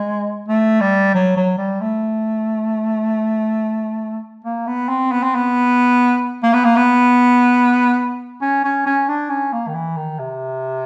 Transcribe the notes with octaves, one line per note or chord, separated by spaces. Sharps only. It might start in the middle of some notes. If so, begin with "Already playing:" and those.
Already playing: G#3
A3
G3
F#3
F#3
G3
A3
A#3
B3
C4
B3
C4
B3
A#3
B3
A#3
B3
C#4
C#4
C#4
D4
C#4
A#3
D#3
E3
D#3
C3